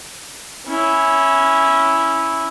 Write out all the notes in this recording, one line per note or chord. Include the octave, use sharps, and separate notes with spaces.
C#4 E4